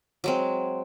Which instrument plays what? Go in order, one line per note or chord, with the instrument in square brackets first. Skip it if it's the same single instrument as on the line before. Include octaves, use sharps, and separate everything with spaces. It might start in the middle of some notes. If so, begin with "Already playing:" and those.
[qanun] F#3 G#3 C4